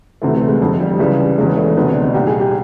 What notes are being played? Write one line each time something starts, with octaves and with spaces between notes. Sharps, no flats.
D2 C3 E3 A3
A3
G#3
F1 F2 D3
G3
C#2 C#3 E3 G3
E1 E2 C#3 E3 G#3
A3
D2 C3 D#3 B3
D4
D#4
C2 A#2 G4
G#4
G4